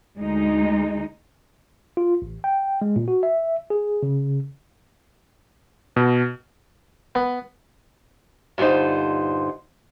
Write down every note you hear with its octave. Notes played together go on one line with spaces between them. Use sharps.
D2 G#3 D#4
F4
A1
G5
G#3
A#2
F#4
E5
G#4
C#3
B2
B3
G2 A#2 D3 D#4 C5